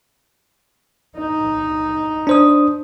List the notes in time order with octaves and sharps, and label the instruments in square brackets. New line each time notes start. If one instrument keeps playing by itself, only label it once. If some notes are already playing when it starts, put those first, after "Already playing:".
[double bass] D#4
[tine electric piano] D4 C5 D#6